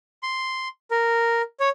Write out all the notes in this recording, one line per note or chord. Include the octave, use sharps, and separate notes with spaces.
C6
A#4
C#5